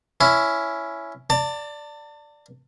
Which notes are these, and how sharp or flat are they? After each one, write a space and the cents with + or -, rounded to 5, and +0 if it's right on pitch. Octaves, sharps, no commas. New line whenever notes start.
C#4 +10 E4 +10
D5 +0 A5 +35